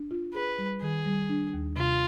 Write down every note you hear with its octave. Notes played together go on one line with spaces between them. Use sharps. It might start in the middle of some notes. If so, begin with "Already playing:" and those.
Already playing: D4
F4
G#4 B4
G3
D#3 G#4
G3
D4
D#2
C3 F4